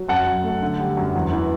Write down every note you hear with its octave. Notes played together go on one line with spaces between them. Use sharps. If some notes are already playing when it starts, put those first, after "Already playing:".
Already playing: F#3
F#2 F#5 A5
F#2
A3
D3
G3
F#2
E2
E3